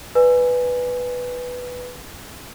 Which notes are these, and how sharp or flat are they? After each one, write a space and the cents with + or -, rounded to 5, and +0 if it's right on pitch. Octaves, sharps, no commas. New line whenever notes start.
B4 +0 D5 +25 G#5 +0